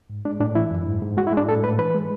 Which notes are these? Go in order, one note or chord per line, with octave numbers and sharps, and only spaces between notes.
G#2
G#3 D4
A2 D4
E3 E4
F#2
G#2
G#2
G#3 F#4
E4
G#3 D4
A2 A4
A2 B4
E3 B4
G#3